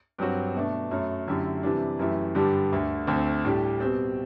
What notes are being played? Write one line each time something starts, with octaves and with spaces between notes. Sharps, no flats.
G2 F#3 C4 F#4
B2 A3 D4
F#2 F#3 A3
F#2 D3 A3 E4 G4
C3 E3 G3 D4
F#2 E3 A3 E4 G4
G2 D3 G3 D4 G4
D2 D3 A3
D2 D3 A3 C4
A2 G3 D4 G4
B2 G3 C4